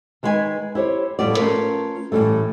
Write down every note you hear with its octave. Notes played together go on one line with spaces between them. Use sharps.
D#3 G#3 B4 F#5 G#5
E4 G4 C5 C#5
A2 F3 G3 B3 D5
A3 C#4 D#4 F4 A#4 B4
A2 E3 F#3 G3 A3